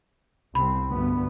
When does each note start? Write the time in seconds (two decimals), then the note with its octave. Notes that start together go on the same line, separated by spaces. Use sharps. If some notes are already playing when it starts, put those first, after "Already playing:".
0.55 C2 C4 B5
0.90 D2 G2 B3